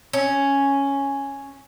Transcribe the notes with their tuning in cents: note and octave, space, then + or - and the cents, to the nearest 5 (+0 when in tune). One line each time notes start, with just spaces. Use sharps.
C#4 +0